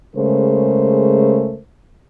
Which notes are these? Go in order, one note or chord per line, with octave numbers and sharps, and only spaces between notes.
C#3 G#3 A3 A#4 C5